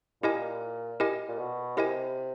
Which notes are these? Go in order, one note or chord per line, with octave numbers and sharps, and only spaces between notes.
A#2 E4 G4 A#4 D#5 G#5
E4 G4 A#4 D#5 G#5
A#2
B2
C3 E4 G4 A#4 D#5 G#5